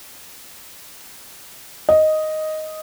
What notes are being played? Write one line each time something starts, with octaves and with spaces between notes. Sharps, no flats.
D#5